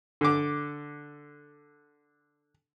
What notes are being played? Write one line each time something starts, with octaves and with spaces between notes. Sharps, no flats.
D3 D6